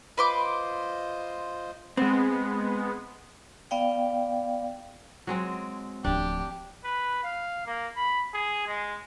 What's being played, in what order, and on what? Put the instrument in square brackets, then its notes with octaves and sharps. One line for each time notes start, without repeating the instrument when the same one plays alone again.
[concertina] F4 C5 D#5 [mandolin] B4 C6 D6
[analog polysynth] G#3 B3 [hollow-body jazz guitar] C4
[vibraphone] B3 D5 F5 G5
[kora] F#3 G#3 C4
[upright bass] D1 F3 [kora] D4 [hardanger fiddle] G4
[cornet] B4
F5
A#3
B5
G#4
G#3